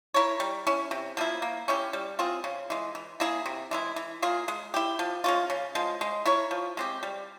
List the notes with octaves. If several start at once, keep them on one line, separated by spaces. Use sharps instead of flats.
E4 A#4 C#5
G3
C#4 E4
C3
F3 A#3 E4
A#3
C#4 E4 G4
G3
C4 F4 G#4
C#3
E3 G#3
E3
A#3 E4 G#4
C3
E3 G#3 E4
E3
A#3 F4 G#4
G#3
E4 G4
F3
G#3 C#4 F4
C#3
F3 G#3
G#3
E4 A#4 C#5
F3
G#3 C4 G4
G3